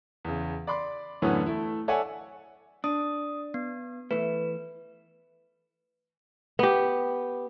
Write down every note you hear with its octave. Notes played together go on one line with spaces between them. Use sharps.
E2 C#3
D5 B5 C6 D6
F#2 A2 D3 E3 B3 C#4
A3 E4
A4 C#5 D5 E5 F#5 G#5
D4 D#6
B3
E3 A3 B4
B3 G4